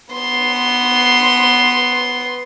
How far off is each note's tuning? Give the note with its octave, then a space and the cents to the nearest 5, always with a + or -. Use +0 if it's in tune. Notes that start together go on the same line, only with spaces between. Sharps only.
B3 +0 C6 +0